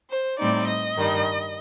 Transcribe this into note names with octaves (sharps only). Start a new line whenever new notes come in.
C5
A2 G3 C4 D#4 D5
D#5
G2 D#3 G3